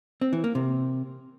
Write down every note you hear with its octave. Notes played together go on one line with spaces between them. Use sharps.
C4
E3
A#3
C3